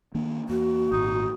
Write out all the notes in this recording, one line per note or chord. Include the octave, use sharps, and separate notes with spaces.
D#3 A#3 D4
E2 A#3 F#4
G#1 A#2 D#4